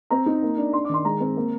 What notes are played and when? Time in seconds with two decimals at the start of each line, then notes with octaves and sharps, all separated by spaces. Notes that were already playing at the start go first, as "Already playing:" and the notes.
0.11 C4 A#5
0.26 D#4
0.42 A#3
0.57 D4
0.73 D4 C6
0.84 D6
0.90 D#3 C6
1.05 G#3 A#5
1.20 C4
1.37 A#3